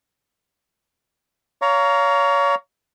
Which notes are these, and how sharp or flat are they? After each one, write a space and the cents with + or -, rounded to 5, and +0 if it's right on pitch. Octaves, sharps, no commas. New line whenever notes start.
C#5 +30 F5 +0 A#5 +0